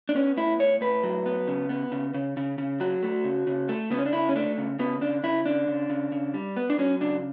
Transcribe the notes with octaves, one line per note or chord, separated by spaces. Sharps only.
D4
B3 C#4
A2 E4
A2 C#5
A2 B4
F#3
B3
C#3
B3
C#3
C#3
C#3
C#3
F#3 F#4
A3
C#3
C#3
A3
C#3 B3
C#4
D4
C#3 E4
C#4
A3 D4
C#3
C#3 B3
C#3 D4
C#3 E4
C#3 D4
C#3
C#3
C#3
G3
B3
D4
F#3 C#4
C#3 D4